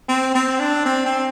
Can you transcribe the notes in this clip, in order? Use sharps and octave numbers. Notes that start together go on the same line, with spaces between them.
C4
C4
D4
C4
C4